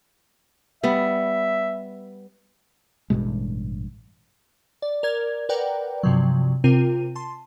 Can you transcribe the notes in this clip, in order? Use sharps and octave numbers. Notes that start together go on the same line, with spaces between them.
G3 B3 E5
A1 G2 B2 G#3
D5
A#4 D5 G#6
A#4 B4 D5 F#5 G5 A#5
G2 C3 F3 F#3
C3 C4 F4 A#4 D#7
A5 C6